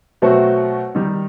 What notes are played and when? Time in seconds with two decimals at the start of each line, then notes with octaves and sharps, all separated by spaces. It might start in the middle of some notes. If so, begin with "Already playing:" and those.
0.22 B2 F#3 A3 C4 F#4
0.95 D#3 G3 D#4